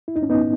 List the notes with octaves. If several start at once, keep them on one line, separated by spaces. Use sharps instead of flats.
E4
D#4
C#4
B3 D#4